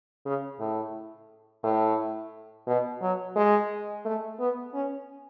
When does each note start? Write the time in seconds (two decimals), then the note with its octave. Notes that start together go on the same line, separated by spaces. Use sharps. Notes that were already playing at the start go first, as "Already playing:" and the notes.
0.25 C#3
0.60 A2
1.64 A2
2.67 B2
3.02 F#3
3.36 G#3
4.05 A3
4.40 B3
4.74 C#4